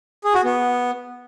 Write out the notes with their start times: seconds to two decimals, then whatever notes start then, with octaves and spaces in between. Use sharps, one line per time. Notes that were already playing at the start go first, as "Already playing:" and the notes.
0.24 G#4
0.34 F#4
0.44 B3